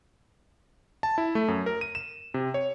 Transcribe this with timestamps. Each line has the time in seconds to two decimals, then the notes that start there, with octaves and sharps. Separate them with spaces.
1.03 A5
1.18 E4
1.35 A3
1.48 F#2
1.66 A#4
1.81 D#7
1.95 E7
2.34 C3
2.54 C#5